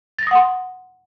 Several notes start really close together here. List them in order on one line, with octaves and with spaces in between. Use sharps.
A6 A#6 D#6 F#5 C6